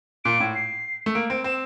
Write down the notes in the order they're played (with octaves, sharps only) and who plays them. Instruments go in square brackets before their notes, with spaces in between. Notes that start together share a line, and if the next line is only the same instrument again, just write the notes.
[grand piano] A#2 [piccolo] D7
[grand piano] A2
[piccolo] C7
[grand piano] A3
[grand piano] A#3 [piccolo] D7
[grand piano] C4 [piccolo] D7
[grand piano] C4 [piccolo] E7